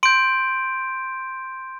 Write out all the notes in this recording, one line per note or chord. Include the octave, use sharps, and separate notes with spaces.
C6 G6 D7